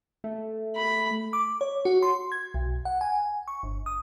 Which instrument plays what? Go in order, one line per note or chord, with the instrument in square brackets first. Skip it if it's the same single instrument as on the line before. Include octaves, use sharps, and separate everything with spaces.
[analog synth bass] A3
[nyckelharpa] B5
[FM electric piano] D6
C#5
F#4
C6
G#6
B1
F#5
G#5
C#6
G1
D#6